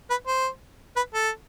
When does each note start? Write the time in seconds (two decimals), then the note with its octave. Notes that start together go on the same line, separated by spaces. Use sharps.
0.10 B4
0.27 C5
0.96 B4
1.14 A4